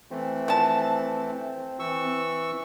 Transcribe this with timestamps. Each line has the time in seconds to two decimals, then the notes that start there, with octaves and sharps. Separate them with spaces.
0.11 E3 A3 C4
0.48 F3 A5
1.79 E3 C#6 E6